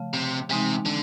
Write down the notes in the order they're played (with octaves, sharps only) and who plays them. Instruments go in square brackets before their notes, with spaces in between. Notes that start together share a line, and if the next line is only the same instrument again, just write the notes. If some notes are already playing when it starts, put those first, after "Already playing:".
Already playing: [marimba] C#3 F3 A3
[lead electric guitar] C3
[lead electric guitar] C3 [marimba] E3 G#3 C4 D#4
[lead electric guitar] D3